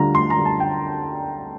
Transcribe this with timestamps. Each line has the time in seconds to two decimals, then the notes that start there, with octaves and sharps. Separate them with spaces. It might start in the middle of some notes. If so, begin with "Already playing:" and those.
Already playing: D2 D3 G3 D4 F4 A#5
0.15 D2 C6
0.30 A#5
0.38 D3 G3 D4 F4
0.45 A5
0.60 G5